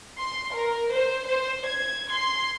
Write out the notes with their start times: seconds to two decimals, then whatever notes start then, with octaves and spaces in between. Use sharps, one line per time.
0.18 C6
0.53 A#4
0.92 C5
1.26 C5
1.67 G#6
2.12 C6